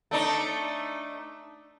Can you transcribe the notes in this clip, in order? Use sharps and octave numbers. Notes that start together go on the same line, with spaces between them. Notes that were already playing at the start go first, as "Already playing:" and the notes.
A3 D4 D#4